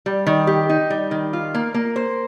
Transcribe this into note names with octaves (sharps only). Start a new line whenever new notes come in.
G3
D#3
G4
D#4
G3
D#3
F4
A#3
A#3
C5